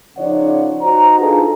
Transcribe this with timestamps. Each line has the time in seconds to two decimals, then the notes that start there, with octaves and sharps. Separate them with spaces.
0.18 C#3 F3 D#4 C#5 D5 F#5
0.81 D#4 F#4 C5 A#5
1.20 D4 D#4 F4 G#4 A4 B4